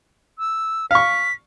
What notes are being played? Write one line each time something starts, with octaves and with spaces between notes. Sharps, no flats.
E6
F5 C#6 B6